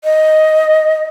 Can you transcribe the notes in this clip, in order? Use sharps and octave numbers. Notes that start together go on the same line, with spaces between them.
D#5